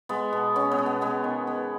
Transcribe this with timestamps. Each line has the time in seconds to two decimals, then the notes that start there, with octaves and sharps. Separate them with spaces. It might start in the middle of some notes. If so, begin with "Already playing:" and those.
0.09 G#3 B3
0.33 B2
0.55 B3 C#4
0.71 B3
0.78 B2
0.86 B3
1.01 G#3 B3
1.24 D#3
1.47 B3